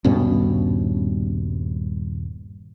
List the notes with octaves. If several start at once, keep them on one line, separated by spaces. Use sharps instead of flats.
D#1 G2 B2 C#4